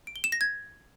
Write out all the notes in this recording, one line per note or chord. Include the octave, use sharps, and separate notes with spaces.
D7
G7
E7
A#6
G#6